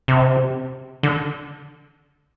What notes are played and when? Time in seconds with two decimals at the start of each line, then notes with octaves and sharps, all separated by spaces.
0.08 C3
1.03 D3